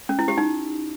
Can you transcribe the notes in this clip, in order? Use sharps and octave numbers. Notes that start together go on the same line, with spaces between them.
C#4
E4
G4
D#4